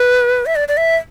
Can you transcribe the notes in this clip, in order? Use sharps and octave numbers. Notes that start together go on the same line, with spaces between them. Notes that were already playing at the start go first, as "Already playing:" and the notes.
Already playing: B4
E5
D5
D5
E5